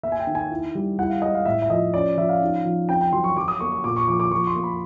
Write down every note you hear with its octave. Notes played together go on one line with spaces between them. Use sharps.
A#3 E5
G#5
G5
D#3
G#5
E4
G3
E4 F#5
F5
G#3 D#5
F5
A2 E5
E5
F3 D#5
C#4 D5
F3 E5
F5
D#4
F3
C4 G5
G5
F#3 C6
C#6
F#3 D6
D#6
A#3 C#6
C#6
A#2 D6
C#6
F3 D6
D6
F3 C#6
C6
A#3
B5